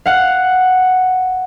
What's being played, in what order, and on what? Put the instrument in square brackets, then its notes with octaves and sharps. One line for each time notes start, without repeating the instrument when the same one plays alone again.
[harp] F5 F#5